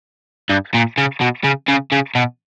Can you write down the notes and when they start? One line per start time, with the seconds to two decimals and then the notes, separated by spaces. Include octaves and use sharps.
0.50 G2
0.74 A#2
0.98 C#3
1.21 B2
1.44 C#3
1.68 C#3
1.92 C#3
2.15 B2